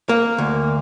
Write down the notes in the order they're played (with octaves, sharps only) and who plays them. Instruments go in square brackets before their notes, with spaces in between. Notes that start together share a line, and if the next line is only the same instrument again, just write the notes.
[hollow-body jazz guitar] A#3
D2